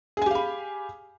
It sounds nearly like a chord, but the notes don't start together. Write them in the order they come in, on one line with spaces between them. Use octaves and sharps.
G#4 G#5 G4 F5 B5